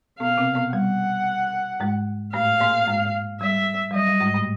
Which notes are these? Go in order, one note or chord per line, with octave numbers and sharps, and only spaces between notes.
B2 B3 F5
C3 C4
B2 B3
G3 F#5
G#2 G#3
A2 A3 F5
A#2 A#3
G#2 G#3
G3 E5
G3
F#3 D#5
G3
G#2 G#3
A2 A3